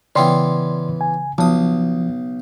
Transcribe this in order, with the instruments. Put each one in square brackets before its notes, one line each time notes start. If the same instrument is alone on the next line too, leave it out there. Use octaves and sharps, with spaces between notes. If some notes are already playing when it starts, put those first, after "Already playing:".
[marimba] C#3 G5 [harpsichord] E3 B3 C#4 [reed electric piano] D5 C6
[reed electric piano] G#5
[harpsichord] B1 D#6 [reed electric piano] F3 [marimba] A5